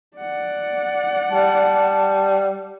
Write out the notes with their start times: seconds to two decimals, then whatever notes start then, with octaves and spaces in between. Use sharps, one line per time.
0.17 D5 F#5
1.31 G3 A5